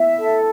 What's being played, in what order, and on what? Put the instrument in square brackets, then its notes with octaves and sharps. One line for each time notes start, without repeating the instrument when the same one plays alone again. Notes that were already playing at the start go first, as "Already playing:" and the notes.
Already playing: [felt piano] B3 E4 [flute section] E5
[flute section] A4